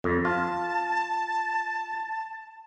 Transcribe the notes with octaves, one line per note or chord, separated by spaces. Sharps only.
F2
F4 A5